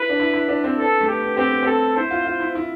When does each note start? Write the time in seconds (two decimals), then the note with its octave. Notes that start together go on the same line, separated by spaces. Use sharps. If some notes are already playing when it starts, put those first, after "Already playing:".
Already playing: E4 B4
0.09 D4
0.20 E4
0.34 E4
0.49 D4
0.64 C4
0.78 B3 A4
1.01 A3
1.08 B3 G4
1.22 B3
1.37 C4 G4
1.50 B3
1.63 C4 A4
1.97 E4 C5
2.11 F4
2.25 F4
2.40 E4
2.55 E4